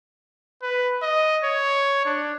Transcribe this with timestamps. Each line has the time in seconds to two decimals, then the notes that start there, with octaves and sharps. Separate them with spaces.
0.62 B4
1.02 D#5
1.43 C#5
2.05 D4